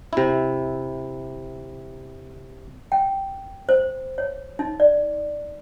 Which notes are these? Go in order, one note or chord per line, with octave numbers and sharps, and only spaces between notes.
C3 E4
G5
C5
C#5
D#4
D5